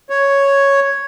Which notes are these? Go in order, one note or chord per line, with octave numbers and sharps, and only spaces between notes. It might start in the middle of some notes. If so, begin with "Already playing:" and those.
C#5